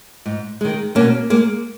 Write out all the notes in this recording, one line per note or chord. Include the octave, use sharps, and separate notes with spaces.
G#2
D#3 G#3
B2 A#3 C#4
G#3 A#3